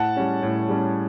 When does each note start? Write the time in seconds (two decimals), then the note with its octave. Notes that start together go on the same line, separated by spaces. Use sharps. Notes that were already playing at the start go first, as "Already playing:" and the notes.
Already playing: A2 F#5 A5
0.16 G3 C#4
0.43 A2
0.69 G3 C#4